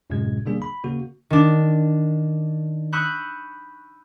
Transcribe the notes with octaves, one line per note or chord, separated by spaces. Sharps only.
G1 F#2 A2 C3 G#3 G#6
B2 D3 G3 A#3 D4 G#4
B5
C#3 A#3 F#4
D#3 D4
B5 C#6 D#6 E6 F#6 G6